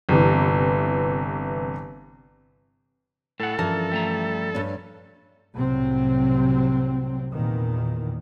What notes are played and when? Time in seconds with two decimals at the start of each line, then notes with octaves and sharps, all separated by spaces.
0.09 G1 C3 E3
3.40 A2 A4 F#5 G#5
3.59 G2 E3 F3 C#4 A#4 A5
3.92 G3 A3 A#5
4.55 G2 C#4
5.55 C2 A2 C3 F#3 C4
7.32 E2 A#2 D#3